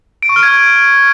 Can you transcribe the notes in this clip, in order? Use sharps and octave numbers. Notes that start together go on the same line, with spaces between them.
D7
C#6
F6
G#6